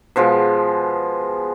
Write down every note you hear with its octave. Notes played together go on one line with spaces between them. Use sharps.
B2 F3 G#3